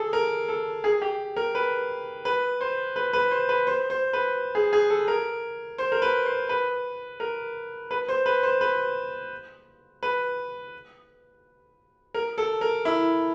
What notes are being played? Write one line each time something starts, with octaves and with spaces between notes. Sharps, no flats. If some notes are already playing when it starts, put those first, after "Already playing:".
Already playing: G#4 A4
A#4
A4
G#4
G4
A#4
B4
B4
C5
B4
B4
C5
B4
C5
C5
B4
G#4
G#4
A4
A#4
C5
A#4
B4
C5
B4
A#4
B4
C5
B4
C5
B4
B4
A#4
A4
A#4
E4